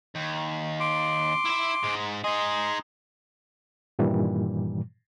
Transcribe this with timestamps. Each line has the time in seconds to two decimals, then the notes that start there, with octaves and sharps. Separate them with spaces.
0.15 D#2
0.80 C6 D6
1.45 E4 E5
1.84 G#2 G#3
2.24 D#4 G#4 D#5 C6
3.99 G2 A#2 D#3 E3 G3